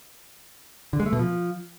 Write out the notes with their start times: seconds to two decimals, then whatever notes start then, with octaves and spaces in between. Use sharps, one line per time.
0.93 D3
1.00 G#3
1.06 A3
1.13 B2
1.19 F3